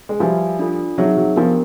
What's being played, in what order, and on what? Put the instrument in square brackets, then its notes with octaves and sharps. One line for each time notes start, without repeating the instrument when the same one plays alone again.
[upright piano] G#3
[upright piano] F3 G3 [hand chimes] F#4 B4 E5 G#5
[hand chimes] D4 F4 A4
[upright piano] F#3 [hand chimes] C4 D#4 G#4 C#5 E5
[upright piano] F#3
[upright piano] F3 [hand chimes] B3 D4 G4 A#4